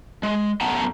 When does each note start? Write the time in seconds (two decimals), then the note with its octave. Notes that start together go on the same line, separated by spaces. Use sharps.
0.23 G#3
0.61 F#2 A3 B3 F#5 A5 A#5